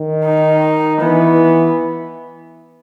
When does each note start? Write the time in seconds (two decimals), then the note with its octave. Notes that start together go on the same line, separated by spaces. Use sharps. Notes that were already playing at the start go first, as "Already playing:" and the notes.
Already playing: D#3
0.25 D#4
1.02 E3 B3